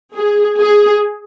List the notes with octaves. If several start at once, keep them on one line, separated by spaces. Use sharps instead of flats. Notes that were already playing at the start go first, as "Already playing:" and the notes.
G#4
G#4